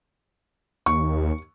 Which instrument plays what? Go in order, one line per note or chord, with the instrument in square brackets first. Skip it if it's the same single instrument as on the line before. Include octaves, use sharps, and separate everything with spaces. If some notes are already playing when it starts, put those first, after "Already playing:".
[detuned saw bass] D#2 [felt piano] C#6